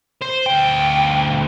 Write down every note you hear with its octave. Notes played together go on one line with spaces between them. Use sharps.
C5
D2 G5